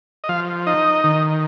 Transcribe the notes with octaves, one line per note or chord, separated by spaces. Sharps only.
D#5
F3 F5
D#4 D#5
D#3